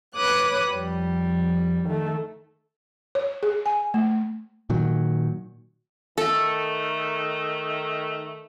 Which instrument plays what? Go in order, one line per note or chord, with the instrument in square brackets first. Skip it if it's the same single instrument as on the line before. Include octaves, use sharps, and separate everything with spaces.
[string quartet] B4 C#5 D6 D#6 F#6
F2 G3
D#3 A3
[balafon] C#5
G#4
G#5
A3
[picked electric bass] A#2 D#3 F#3
[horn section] D#3 A3 [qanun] A4